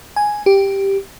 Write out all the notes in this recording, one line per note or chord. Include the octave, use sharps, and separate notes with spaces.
G#5
G4